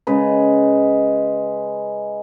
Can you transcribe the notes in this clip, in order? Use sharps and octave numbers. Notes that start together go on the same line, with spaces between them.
C#3 G#3 B4